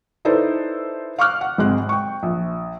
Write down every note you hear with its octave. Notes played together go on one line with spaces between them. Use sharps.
D#4 E4 A4 B4 C5 D5
F5 C#6 D6 F6 F#6
F#5
G#1 C3 G#3 F#6
G5 C#6
A#1